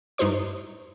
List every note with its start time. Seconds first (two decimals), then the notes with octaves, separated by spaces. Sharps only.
0.18 G2 D#4 E4 C5 C#6